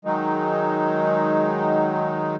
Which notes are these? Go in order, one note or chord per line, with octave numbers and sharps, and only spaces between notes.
D#3 F#3 G#3 D#4